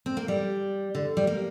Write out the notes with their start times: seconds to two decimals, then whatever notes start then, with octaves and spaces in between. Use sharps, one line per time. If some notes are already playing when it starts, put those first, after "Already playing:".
0.06 C4
0.17 A#3
0.28 G3
0.95 D3
1.17 G3
1.27 A#3